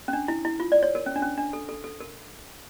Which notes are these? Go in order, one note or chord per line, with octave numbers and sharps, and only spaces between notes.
C#4
D4
E4
E4
F4
D5
C#5
A#4
C#4
D4
C#4
D4
A4
A4
A4
A#4